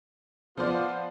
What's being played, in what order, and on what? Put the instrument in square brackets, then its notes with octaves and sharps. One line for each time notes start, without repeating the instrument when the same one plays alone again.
[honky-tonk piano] F3 C5 D5 [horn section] B3 F4